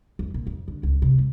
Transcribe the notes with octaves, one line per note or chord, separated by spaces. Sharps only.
F2
A#2
F2
D3
C#2
C3
G#3